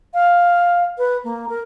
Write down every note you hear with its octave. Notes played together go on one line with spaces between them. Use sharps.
F5
B4
A#3
A#4